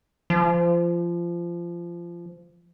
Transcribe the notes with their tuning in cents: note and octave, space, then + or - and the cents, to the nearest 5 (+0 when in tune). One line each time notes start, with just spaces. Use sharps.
F3 -20